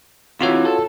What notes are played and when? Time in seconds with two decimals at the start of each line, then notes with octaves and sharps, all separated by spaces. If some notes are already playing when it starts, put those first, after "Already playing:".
0.41 C3 E3 F4 F#4 C#5
0.65 A4